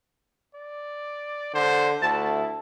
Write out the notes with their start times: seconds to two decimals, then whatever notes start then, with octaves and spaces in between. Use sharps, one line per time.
0.55 D5
1.54 D3 C5
2.02 D2 E4 A5